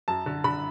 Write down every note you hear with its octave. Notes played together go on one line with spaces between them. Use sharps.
F#2 A5
D3
D3 B5